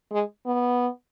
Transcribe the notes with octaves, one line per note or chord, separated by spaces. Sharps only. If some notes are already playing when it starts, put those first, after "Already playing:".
G#3
B3